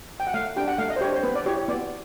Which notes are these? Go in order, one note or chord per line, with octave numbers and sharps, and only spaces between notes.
G5
F#5
A3 F5
D4 G4 G5
F#5
A3 F5
D#5
C5
D4 G4 C#5
C5
B3 B4
D5
E4 G4 C#5
B3 D5